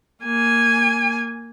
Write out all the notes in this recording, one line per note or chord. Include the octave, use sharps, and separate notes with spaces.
A#3 G#5